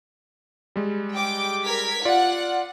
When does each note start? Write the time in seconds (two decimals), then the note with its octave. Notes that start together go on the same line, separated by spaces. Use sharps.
0.76 G3 G#3
1.12 G5 D6
1.63 A#4 G#6 B6
2.05 F4 D5 F#5